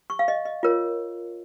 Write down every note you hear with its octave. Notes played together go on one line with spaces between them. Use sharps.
C#6
F5
D#5
D#5
F4 A#4 C#5